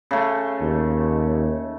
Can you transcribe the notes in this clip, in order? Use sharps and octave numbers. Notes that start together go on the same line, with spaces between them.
C#3 A3
D#2